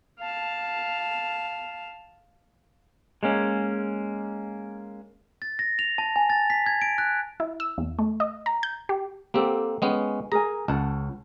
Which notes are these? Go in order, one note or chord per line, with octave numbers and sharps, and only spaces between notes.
F5 A5
G#3 A#3 C#4
A6
A#6
F7
A5
G#5
A6
B6
G#6
D7
F#6
E4
E6
E2
A3
D#5
A#5
G6
G4
A#3 C4 G4 A4 F#5
G#3 B3 C#4 G5
G#4 A#4 G#5 A#5
C#2 C#4 F#5 A5